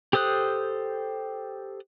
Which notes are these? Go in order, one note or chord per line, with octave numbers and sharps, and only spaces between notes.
G4 A4 C5 D#6 F#6